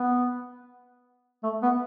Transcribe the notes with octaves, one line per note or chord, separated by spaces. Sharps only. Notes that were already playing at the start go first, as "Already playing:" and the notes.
Already playing: B3
A3
B3